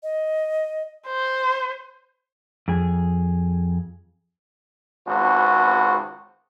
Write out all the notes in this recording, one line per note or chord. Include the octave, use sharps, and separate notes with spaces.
D#5
C5
F2 G#4
G#1 C#2 C4 F#4 B4